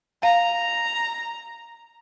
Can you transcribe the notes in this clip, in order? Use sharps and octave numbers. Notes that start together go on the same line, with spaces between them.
F5 A#5